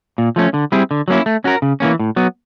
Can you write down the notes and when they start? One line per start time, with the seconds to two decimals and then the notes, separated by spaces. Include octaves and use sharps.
0.18 A#2
0.36 F3 A3 C#4
0.54 D3
0.72 G3 C4 E4 G#4
0.91 D3
1.08 F#3 A#3 C#4 E4
1.26 A3
1.44 C#4 F#4 A#4
1.62 C#3
1.80 E3 G3 A#3 C#4
2.00 A2
2.16 F#3 B3